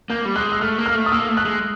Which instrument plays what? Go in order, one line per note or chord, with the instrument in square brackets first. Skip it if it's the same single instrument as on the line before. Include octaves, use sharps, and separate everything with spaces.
[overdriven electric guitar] A#3 [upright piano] G6
[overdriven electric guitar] G3
[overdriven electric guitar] G#3 [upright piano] F#6
[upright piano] E6
[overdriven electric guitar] A3 [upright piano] F6
[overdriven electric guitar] A#3
[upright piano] F6
[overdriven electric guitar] A3
[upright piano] D#6
[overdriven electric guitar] A#3 [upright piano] E6
[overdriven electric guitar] A3
[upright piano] F#6
[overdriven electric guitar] G#3